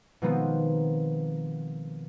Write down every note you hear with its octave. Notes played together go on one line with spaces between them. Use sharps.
B2 D#3 F3 G#3 B3 C4